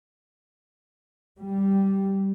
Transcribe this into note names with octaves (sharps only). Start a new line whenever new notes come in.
G3